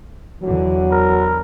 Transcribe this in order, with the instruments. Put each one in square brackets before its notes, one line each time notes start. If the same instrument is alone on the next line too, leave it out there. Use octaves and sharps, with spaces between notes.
[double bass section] E2 D3 E3 [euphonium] F#3
[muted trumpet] A#4